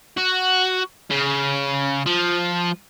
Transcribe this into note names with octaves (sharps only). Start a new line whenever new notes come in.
F#4
C#3
F3